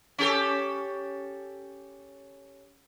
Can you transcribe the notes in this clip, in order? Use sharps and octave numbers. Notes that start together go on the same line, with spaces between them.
C#4 G4 A4